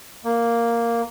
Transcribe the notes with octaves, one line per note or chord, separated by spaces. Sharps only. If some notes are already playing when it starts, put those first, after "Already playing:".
A#3